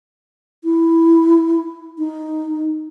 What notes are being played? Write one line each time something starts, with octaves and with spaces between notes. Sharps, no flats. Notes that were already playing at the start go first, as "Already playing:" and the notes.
E4
D#4